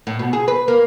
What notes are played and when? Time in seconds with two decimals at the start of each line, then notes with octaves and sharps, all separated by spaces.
0.07 A2
0.19 B2
0.33 G#4
0.48 B4
0.68 A#3